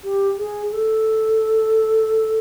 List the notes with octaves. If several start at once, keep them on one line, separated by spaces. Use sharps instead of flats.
G4
G#4
G#4
A4